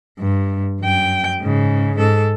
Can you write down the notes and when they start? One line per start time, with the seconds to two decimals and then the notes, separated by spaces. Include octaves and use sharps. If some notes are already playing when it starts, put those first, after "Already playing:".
0.19 G2
0.80 F#2 G5
1.40 G#2 C#3
1.96 G#2 A4